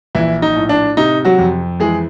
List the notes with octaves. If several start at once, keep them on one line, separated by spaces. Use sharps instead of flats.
A#1 E3 E4
D#4
A2
D4
C3 D#4
F#3 F#4
F2
E3 G#3 G#4